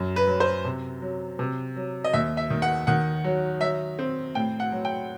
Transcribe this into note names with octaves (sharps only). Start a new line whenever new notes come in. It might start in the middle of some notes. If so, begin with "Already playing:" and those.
Already playing: F#2
B4
F#3
C5
C3
F#3
C3
F#3
D#5
D#2 E5
E5
D#3
F#5
D#3 F#5
F#3
F#3 E5
C4
A2 G5
F#5
F#3
G5